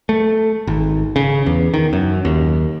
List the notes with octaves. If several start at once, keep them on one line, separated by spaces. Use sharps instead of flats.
A3
G#1
C#3
E2
D#3
F#2
D#2